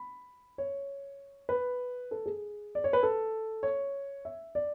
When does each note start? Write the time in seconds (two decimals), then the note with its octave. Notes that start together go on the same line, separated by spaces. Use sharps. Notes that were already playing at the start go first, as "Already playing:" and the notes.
Already playing: B5
0.58 C#5
1.49 B4
2.11 A4
2.26 G#4
2.75 D5
2.84 C#5
2.93 B4
3.03 A4
3.63 C#5
4.25 E5
4.55 D5